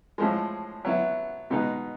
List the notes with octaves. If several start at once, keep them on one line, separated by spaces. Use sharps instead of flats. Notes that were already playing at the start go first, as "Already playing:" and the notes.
A2 F3 G#3
F#3 B3 E4
B2 G#3 B3 D#4